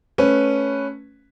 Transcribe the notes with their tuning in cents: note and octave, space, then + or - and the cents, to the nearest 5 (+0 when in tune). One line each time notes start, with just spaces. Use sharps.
A3 +0 C#4 +0 B4 +0